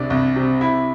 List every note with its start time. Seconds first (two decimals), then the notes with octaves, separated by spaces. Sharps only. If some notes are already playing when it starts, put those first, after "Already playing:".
Already playing: C2 C3 D4
0.10 C2
0.36 C3
0.61 E4